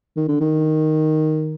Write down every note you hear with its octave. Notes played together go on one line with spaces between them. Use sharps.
D#3
D3
D#3